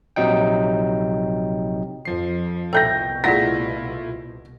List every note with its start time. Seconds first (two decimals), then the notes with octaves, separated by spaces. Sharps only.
0.16 A#1 C3 F#3 D#4 G5
2.05 F2 F3 C7
2.73 C2 B2 A4 E5 G5 G6 A#6
3.24 A3 E4 F4 G#4 D5 F#5 A#6 B6